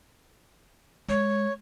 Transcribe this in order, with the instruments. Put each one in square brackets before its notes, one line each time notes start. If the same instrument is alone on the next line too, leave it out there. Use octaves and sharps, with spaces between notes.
[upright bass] G#3 [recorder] C#5